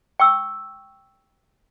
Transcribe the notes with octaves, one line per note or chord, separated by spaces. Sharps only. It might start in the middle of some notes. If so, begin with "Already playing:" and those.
G5 C#6 E6